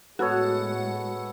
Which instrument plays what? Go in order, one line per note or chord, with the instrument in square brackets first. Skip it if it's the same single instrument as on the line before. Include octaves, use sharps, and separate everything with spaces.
[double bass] A2 G#3 [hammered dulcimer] B3 A4 C#5 [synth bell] F#4